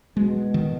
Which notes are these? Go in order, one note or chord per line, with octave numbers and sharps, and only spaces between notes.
B2 G#3
D#3